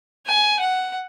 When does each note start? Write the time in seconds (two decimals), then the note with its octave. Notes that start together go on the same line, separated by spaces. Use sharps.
0.27 G#5
0.60 F#5